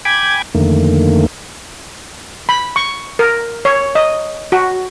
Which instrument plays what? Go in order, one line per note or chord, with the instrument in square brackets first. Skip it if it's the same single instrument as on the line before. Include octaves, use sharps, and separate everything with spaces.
[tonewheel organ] G5 G#5 B5 D6 G#6
F2 D3 D#3 A3 A#3
[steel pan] B5
C#6
A#4
C#5
D#5
F#4